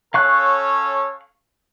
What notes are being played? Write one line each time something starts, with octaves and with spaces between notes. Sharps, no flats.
C#4 A4 C#5 F5 C#6 F#6